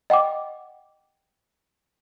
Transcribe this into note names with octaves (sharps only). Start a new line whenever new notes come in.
D#5 F#5 G5 D6